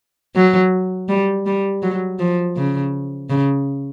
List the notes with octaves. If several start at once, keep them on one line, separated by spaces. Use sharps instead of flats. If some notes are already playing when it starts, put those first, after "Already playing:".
F#3
G3
G3
F#3
F3
C#3
C#3